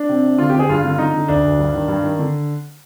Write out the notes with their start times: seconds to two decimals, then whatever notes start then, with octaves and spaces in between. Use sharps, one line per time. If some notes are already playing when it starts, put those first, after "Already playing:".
Already playing: D4
0.09 C3
0.24 C3
0.39 D3 F4
0.50 D3 G4
0.59 G#4
0.69 G2 F4
0.84 D3
0.98 D3 D#4
1.14 D3
1.28 D2 D4
1.44 D2
1.59 G2
1.74 D#3
1.88 G2
2.03 D#3
2.19 D3